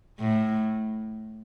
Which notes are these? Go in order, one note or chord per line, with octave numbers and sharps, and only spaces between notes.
A2